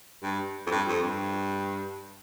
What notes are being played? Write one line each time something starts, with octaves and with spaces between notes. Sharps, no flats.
G2
F2
G2
F2
G2